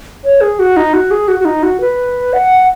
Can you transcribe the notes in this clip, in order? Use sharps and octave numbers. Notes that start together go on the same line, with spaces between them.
C#5
G#4
F#4
D#4
F#4
G#4
F#4
F#4
D#4
F#4
B4
F#5